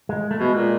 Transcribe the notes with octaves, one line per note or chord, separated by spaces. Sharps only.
G#3
A3
B2 G#3
A#2